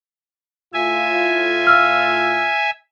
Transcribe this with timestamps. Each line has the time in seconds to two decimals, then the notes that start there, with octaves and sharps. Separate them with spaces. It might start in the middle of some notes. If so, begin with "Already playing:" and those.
0.74 A2 F4 E5 G#5
1.67 E6 F6